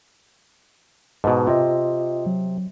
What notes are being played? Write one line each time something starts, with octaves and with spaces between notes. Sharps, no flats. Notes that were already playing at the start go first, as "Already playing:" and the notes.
G#2 B2 B4 D#5 A5
C3 F4 D#5
F#3